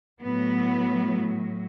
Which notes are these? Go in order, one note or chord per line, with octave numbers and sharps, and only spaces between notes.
A2 F#3 B3